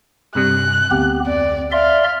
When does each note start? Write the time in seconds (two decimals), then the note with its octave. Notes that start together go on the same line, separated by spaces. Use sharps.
0.35 G2 C3 G3 F#6
0.91 D2 B3 C4 G4
1.27 F2 D5
1.72 D5 E5 F5 C6